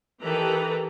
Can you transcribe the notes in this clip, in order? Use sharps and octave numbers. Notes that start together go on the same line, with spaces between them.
D#3 E3 G4 A4 B4 A#5